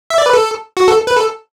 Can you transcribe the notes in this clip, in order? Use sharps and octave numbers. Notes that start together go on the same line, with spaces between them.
E5
D5
B4
A4
F#4
A4
B4
A4